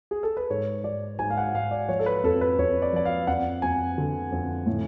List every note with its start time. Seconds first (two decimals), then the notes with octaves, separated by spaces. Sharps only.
0.11 G#4
0.23 A4
0.37 B4
0.50 G#2 C#5
0.84 G#2 D5
1.19 G#2 G#5
1.30 F5
1.37 F#5
1.54 G#2 F5
1.71 D5
1.88 F3 C#5
1.99 A4
2.06 B4
2.24 F2 A4
2.41 B4
2.58 F2 C#5
2.82 D5
2.93 F3 D5
3.05 F5
3.27 F2 F#5
3.62 F2 G#5
3.98 D3
4.32 F2
4.66 A2